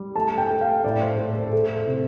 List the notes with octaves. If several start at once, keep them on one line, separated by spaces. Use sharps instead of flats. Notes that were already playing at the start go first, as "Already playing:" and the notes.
Already playing: G3
A3 A5
G5
A3
F5
A2 D5
C5
A2 A4
A4
A3 A4
C5
C3 C5